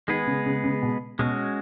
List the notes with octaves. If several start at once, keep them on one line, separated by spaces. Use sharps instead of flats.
D#3 G#3 B3 G#4 B4
C#3
C#3
C#3
B2
B2 G#3 C#4 F#4